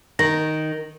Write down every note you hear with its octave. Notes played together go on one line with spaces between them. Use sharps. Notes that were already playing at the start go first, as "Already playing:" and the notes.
D#3 A#6